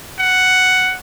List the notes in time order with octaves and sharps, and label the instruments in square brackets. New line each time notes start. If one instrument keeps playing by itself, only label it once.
[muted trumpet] F#5